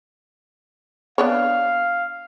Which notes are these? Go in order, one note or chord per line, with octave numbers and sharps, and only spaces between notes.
B3 D4 C#5 F5